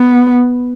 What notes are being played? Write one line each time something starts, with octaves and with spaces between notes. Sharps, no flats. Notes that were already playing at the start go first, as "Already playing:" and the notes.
Already playing: B3